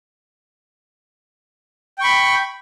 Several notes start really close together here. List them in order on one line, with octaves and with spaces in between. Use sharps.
G5 C#6 B5